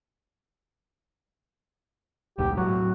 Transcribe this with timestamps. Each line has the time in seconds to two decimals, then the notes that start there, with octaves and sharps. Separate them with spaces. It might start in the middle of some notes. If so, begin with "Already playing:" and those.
2.38 D#1 B1 G#2 G4
2.57 A2 F#3 F#4